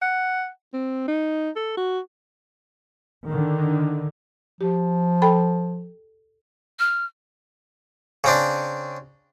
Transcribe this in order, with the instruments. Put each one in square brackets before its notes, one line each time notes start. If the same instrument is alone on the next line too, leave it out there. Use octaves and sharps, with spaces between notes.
[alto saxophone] F#5
C4
D#4
A4
F#4
[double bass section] D3 D#3
[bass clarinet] F3 [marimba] G4
[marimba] A4 G5 B5
[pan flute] F6
[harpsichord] C#3 C4 D4